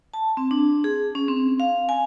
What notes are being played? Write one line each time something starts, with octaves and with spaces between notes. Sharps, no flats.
A5
C4
D4
G#4
C#4
C4
F5
G#5